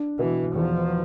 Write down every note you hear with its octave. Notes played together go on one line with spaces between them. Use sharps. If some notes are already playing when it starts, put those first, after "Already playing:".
Already playing: D4
B2 E3
E2 F3